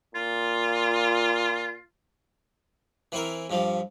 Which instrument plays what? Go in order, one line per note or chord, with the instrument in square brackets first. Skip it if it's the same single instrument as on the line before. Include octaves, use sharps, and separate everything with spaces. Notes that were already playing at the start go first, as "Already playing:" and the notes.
[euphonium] A#2 [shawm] F4
[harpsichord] E3 C4 E4 A#4
G2 F3 G3